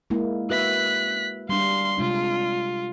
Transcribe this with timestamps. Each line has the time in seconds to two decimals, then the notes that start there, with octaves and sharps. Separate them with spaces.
0.10 G#3 A#3 E4
0.50 F#4 B4 E5 F#6 B6
1.49 G3 D4 F5 C6
1.98 C3 G#3 D4 F4